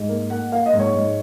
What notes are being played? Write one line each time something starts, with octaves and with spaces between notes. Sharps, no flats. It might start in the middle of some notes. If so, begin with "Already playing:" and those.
Already playing: G#2
A#3
A#3 F#5
A#3 F5
D#5
G#2
C#5
G#2